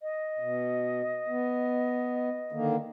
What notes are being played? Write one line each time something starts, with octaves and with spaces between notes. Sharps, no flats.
D#5
B2
B3
D3 D#3 A#3